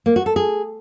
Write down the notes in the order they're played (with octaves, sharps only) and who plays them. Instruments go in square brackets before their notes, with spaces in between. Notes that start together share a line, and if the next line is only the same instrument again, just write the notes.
[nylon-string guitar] A#3
F#4
A4
G#4